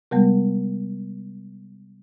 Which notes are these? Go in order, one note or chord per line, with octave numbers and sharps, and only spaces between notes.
C3 G3 G#3 B3